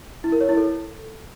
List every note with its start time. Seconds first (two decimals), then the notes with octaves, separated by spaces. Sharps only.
0.24 E4
0.32 A#4
0.41 C#5
0.49 E4
0.57 A4